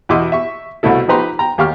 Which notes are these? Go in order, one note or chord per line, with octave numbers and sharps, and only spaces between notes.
E2 B2 E4 D#5 C6 D6
E5 C#6
C2 B2 A3 E4 A4
F3 D#4 G4 B4 A#5 C6
G5 A#5
D#2 G4 F5 C#6 D6 F6